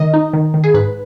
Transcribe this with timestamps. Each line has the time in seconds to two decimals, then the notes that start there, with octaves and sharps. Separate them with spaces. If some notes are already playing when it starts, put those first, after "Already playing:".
Already playing: D#3 D#5
0.14 D#4
0.33 D#3
0.54 D#3
0.64 G#4
0.74 G#2 B4